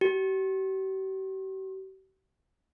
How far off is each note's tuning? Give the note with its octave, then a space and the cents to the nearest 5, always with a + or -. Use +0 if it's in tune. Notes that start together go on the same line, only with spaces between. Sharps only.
G4 -45